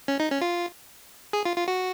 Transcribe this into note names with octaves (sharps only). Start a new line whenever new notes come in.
C#4
D#4
C#4
F4
G#4
F4
F4
F#4